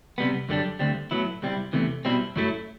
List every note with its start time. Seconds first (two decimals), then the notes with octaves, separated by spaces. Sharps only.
0.18 C3 G3 B3
0.49 F#2 D3 G3 D4
0.79 D2 D3 G3 C4
1.11 A2 F#3 B3 E4
1.42 C2 C3 G3 C4 E4
1.73 E2 C3 E3 A3
2.05 B2 G3 C4 E4
2.36 F#2 F#3 A3 E4